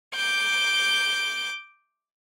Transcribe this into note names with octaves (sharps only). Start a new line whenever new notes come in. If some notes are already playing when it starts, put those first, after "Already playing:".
D6 G6